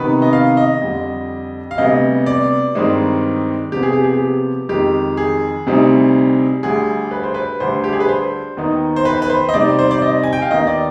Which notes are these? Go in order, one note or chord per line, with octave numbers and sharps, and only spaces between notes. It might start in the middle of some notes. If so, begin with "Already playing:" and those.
Already playing: C3 D#3 B3 D#4 B4
D#5
F5
D#5
F2 D3 G3
F5
D2 C3 G3 B3 D#5
D5
G2 D#3 G#3 C4 D#4
C3 F3 B3 G4
G#4
G4
G#4
G4
F2 D#3 G#3 G4
G#4
D2 C3 G3 C4 D#4
D2 D3 G3 G#4
B4
C5
B4
D2 D3 G3 D4 C5
G4
G#4
B4
C5
D#2 D#3 B3 D#4
C5
B4
B4
C5
D#5
C3 G3 C4 D#4 D5
C5
D5
D#5
G#5
G5
F5
D#2 D#3 B3 D#5
D5